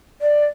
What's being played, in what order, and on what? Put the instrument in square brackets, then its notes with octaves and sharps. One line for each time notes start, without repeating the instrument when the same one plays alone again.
[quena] D5